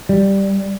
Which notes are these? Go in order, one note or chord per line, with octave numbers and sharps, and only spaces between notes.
G3